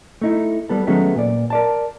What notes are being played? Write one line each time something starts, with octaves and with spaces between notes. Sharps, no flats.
A3 D#4 E4
G3 B3 A4
D#3 F#3 G#3 A3 B3 C#4
A#2 D5
A#4 D5 A5